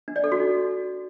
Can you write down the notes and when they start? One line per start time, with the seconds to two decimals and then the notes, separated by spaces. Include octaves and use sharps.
0.08 D4
0.16 D5
0.24 A4
0.32 F#4
0.40 D#4